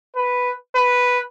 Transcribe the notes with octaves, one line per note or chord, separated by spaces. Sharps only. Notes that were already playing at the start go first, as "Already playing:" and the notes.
B4
B4